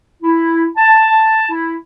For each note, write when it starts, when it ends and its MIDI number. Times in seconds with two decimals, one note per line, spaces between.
0.23 0.66 64
0.76 1.47 81
1.50 1.74 64